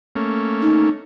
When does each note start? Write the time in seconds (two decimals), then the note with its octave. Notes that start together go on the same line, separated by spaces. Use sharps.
0.16 A3 A#3 C#4
0.62 D#4